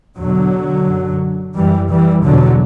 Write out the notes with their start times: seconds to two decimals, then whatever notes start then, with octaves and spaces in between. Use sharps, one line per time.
0.17 E2 B2 D3 F#3
0.86 F#2
1.55 F#2 E3 G3
1.90 E3 G3
2.24 E2 B2 D3 F#3